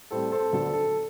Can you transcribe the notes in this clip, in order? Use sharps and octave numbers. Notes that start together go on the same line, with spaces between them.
A2 G3 C4 A4 C5
A4 C5
D2 D3 F#3 B3 A4
A4